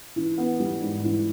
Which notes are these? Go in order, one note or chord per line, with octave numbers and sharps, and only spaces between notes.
E3
B3
G3
G#2
E3